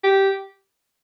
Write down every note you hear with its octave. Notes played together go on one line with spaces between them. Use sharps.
G4